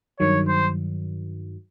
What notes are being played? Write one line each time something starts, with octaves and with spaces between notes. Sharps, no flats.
G2 D#3 F#3 C#5
C5